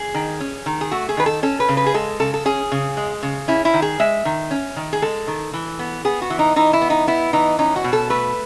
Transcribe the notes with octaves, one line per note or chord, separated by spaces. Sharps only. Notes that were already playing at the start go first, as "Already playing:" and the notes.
Already playing: G#4
D#3
C#4
D#3
G#4
A3 F#4
G#4
D#3 B4
A4
C#4 A4
B4
C#3
B4
G#4
G#3 A4
C#3 A4
A4
C#4 G#4
C#3
G#3
C#3
C#4 E4
E4
D#3
G#4
G#3 E5
D#3
C#4
D#3
G#4
G#3 A4
D#3
E3
B3
B3 G#4
F#4
E3
D#4
E3 D#4
E4
B3
D#4
B3 E4
E3 D#4
C#4 D#4
F#4
B2
A4
A3 B4